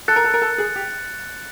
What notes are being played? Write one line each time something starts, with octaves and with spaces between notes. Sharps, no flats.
A4 F#6 A6 C#7
A#4
A4
A#4
A4
G#4
G4